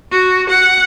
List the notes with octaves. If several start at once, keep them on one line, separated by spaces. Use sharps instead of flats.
F#4
F#5